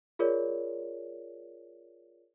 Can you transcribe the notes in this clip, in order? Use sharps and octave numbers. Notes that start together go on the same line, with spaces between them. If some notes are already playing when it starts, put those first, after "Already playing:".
F4 G#4 A#4 C#5 D5